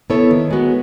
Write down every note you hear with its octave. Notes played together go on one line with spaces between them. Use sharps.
B3 E4 A4 C#5
D#3
G#3 B3 F#4